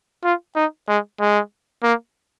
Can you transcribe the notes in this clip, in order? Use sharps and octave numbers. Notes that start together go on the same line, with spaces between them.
F4
D#4
G#3
G#3
A#3